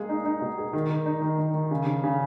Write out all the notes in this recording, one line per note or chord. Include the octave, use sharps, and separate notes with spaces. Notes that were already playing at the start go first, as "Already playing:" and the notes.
Already playing: G#3 A#3 G#4
D#4
D#4
B2
G#4
D#3
D#3
D#4
D#3
D#3
D#3
C#3
C#3
C#3